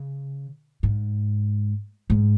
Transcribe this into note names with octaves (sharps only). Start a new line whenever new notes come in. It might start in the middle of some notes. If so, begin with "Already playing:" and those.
Already playing: C#3
G#2
G#2